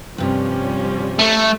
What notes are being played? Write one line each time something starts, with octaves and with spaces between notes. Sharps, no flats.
G2 C3 F3 G3 C#4
A3